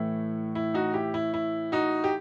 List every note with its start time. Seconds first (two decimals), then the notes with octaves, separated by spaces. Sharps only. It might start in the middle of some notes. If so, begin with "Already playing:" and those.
Already playing: A2 E3 A3 E4
0.55 E4
0.74 D#4 F#4
0.94 E4 G4
1.14 E4
1.34 E4
1.72 D#4 F#4
2.04 G4